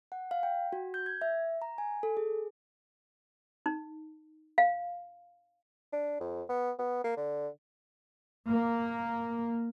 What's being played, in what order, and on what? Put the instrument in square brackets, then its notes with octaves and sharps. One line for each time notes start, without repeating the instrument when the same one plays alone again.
[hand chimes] F#5
F5
G5
F#4
G6
G#6
E5
A#5
G#5
A4
G#4
[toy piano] D#4
F5
[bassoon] D4
F2
B3
B3
A#3
D3
[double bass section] A#3